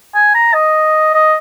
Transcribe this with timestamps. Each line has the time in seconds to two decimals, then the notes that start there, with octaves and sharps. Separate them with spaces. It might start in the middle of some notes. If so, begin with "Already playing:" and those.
0.15 G#5
0.35 A#5
0.53 D#5
1.14 D#5